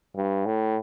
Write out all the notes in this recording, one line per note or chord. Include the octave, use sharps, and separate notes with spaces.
G2
A2